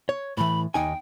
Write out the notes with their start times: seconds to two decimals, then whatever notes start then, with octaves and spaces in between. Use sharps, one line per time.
0.09 C#5
0.37 A2 E3 B5
0.74 D#2 D#4 G5 G#5